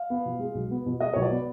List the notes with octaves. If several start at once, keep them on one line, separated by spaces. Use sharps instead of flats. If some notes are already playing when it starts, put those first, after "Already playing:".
Already playing: F5
B3
B2
G#3
B1
B3
B2
G#3 D#5
B1 C#5
D5
B3